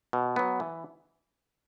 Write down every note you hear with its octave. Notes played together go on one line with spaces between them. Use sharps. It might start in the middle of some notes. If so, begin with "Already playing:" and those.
B2
F#3 B3
E3